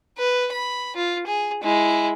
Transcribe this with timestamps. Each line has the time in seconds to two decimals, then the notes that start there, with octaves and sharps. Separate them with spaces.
0.18 B4
0.52 B5
0.96 F4
1.27 G#4
1.63 G#3 E4